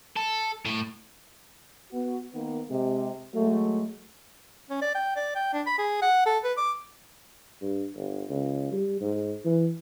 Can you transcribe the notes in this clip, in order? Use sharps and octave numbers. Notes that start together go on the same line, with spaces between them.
A4
A2
B3 F#4
D#3 A#3 B3
C3 G#3
F#3 G#3 A3
C#4
D5
G5
D5
G5
D4
B5
G#4
F#5
A4
B4
D6
G2
G1
C#2
G3
G#2
E3